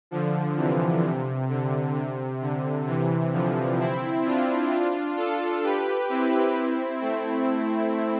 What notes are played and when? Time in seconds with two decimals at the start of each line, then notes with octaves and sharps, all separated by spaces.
0.11 D3 F3
0.57 C3 E3
1.03 C3
1.49 D3
1.95 C3
2.41 D3
2.87 C3 E3
3.33 D3 F3
3.79 C4 E4
4.25 D4 F4
4.71 D4 F4
5.17 F4 A4
5.64 G4 B4
6.09 C4 E4
7.01 A3 C4